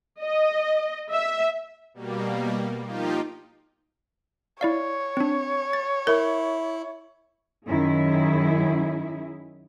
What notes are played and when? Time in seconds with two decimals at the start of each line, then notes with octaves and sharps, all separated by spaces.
0.23 D#5
1.11 E5
1.94 B2 G3 A#3
2.84 F3 A#3 D#4 F4 G4
4.61 E4 C#5 D5 F5
5.17 C4 D4
5.73 A6
6.07 E4 A#4
7.66 F#2 D#3 E4 G#4